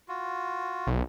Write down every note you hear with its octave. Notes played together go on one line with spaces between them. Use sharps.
F4 F#4
B1